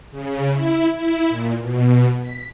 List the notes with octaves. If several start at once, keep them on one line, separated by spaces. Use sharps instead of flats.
C#3
E4
E4
A#2
B2
B6